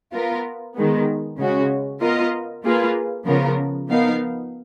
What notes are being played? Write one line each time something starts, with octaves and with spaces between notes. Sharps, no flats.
B3 F4 A#4
D#3 G#3 B3
C#3 G#3 C#4 F#4
B3 F4 A#4 D#5
A#3 F4 G#4 B4
C#3 F3 B3 F4 A#4
F3 B3 D#4 A#4 F5